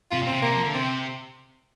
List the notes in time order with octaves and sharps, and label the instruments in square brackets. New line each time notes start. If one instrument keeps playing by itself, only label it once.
[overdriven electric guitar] C3 [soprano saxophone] F4
[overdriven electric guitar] A#2
[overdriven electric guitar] C3 [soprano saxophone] C4
[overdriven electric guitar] C3 [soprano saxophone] A#3
[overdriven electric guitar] F3
D3
[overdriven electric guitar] C3 [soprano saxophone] C4